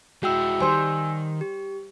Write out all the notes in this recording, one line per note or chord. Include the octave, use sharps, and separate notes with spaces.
G#3 E4 F#4 G5 E6
D#3 G3 C5 G#5 E6
G4